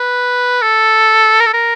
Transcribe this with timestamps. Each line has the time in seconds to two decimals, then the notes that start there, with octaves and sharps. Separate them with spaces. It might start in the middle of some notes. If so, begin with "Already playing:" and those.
Already playing: B4
0.62 A4
1.40 A#4
1.46 A4
1.54 A#4